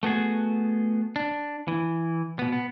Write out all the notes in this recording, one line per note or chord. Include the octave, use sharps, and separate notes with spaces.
A3 B3 F#4 G#4
D4
E3
B2 B3
B3